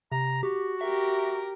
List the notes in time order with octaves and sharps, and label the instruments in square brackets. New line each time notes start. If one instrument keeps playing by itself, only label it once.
[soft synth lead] C3 [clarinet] A#5
[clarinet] F#4 [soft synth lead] G4
[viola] G4 A#4 [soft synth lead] E5